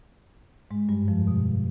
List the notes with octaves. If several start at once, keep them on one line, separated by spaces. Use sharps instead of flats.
G#2 G#3
G2 G3
F2 F3
B2